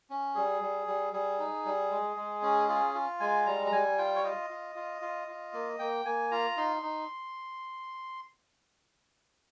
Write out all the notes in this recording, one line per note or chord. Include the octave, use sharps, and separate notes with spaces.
C#4
G3 G#4
G3
G3
G3 G#4
D#4
G3
G#3
G#3
C#4
F4 G#4
F4
G#3 G#5
G3 A#5
A#5
G3 G#5
F4 G5
C#5
F4 D#5
F4
F4
F4
F4
A#3
A#3 G5
A#3 G#5
F4 A#5
D#4 C6
D#4